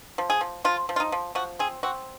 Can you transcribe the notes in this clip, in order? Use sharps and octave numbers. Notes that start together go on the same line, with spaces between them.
F3
G#4
F3
F3 F4
F3
F4
D#4
F3
F3 F#4
C4 G#4
C4 F#4